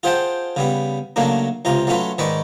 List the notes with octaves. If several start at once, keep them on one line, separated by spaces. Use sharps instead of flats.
F4 G#4 C5 F#5 G5 A5
C#3 G3 B3
C#3 F#3 A3 A#3 D4
C#2 C3 F4 A#5
F#3 A3 C#4 F4 B4
G#2 D#3 G#3 B4 D5 C#6